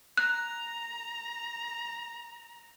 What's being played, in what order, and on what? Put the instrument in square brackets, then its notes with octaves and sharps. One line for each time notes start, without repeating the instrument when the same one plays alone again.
[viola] A#5 [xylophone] F#6